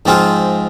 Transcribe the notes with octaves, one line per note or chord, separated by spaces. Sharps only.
G#2 F3 C4 F4 G#4